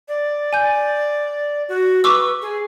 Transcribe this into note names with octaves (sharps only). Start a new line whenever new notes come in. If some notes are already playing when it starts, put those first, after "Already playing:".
D5
G#5 G6
F#4
B4 C#6 D6 E6
G#4